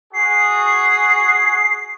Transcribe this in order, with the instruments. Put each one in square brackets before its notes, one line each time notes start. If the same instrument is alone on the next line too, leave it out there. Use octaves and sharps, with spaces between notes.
[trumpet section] F#4 G#4 [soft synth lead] C7